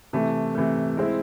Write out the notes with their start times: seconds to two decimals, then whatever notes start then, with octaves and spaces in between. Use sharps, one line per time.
0.13 C3 E3 A3
0.55 C3 E3 A3
0.97 G#3 C4 E4